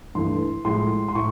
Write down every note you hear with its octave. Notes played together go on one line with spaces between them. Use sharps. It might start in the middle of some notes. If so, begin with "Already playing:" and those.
G2 E3 A3 C6
A2 F3 G#3 C6
C6
A2 C#6